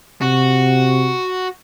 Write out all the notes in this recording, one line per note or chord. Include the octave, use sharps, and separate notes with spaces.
C3 F#4